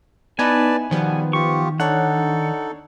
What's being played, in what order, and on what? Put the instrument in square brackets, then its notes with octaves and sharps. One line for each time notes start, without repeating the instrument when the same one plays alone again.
[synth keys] B3 D#4 E4 [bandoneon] B4 D5 A5 [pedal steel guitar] G#5
[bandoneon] B2 G3 [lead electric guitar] D#3 [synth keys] F3 B3
[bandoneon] F4 G4 [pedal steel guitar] C#6
[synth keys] D4 C#5 [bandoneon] D#4 A4 [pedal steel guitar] F#5